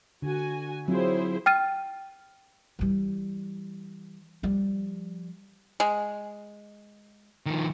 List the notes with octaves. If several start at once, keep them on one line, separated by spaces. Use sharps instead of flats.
D3 F#4 G#5
F#3 C4 E4 F4 G#4 C5
G5 F6 A6 D#7
E3 G3
F3 G3
G#3
D#3 F3